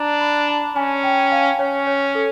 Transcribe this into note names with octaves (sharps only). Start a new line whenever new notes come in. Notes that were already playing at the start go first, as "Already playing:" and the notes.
Already playing: D4 A#5
B5
A5
C#4 G#5
G5
F5
C#4 C#5
C#5
A4